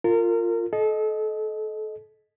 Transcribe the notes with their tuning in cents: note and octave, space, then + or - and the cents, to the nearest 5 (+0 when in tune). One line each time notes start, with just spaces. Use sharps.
F4 +0 A#4 -30
A4 -30 D#5 +0